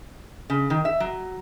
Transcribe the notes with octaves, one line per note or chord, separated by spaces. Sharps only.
C#3
D#3
E5
F#3